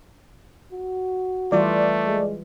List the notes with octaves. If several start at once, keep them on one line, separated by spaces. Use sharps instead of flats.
F#4
E3 G3 A3 F4 D5
G#3